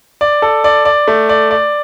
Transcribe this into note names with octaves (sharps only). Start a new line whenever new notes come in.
D5
A4
D5
D5
A3
D5
D5